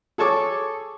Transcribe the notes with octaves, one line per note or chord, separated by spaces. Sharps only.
G#4 A4 C#5 A5 C#6 D6